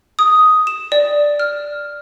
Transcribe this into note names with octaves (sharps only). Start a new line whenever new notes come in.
D#6
E7
D5
F6